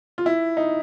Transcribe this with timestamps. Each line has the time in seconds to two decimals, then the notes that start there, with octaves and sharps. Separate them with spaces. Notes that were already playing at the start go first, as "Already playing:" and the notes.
0.18 F4
0.26 E4
0.57 D#4